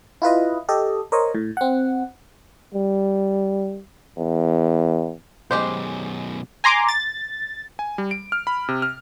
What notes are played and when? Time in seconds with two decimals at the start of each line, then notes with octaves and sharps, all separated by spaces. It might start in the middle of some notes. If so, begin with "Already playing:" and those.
0.22 E4 F4 B4 D#5
0.69 G4 A4 D#5
1.12 A#4 C5 C#5 D#5
1.35 A2
1.57 C4 F#5
2.74 G3
4.17 E2
5.51 F#2 B2 G#3 G4 C5
6.64 G#5 A#5 C6 D6
6.89 A6
7.79 G#5
7.98 G3
8.11 D7
8.32 F6
8.47 B5
8.68 C3
8.82 F6